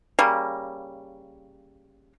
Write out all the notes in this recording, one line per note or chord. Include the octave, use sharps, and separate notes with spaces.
C#3 G3 A#3